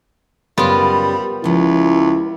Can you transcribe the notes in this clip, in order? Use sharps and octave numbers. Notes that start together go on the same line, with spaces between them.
F#2 C#3 G3 B3 F4 A#4
C#2 F3 E4 G4